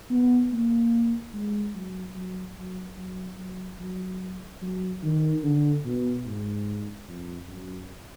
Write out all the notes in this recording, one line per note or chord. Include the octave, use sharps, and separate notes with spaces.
B3
A#3
G#3
F#3
F#3
F#3
F#3
F#3
F#3
F#3
D#3
D3
B2
G#2
F2
F#2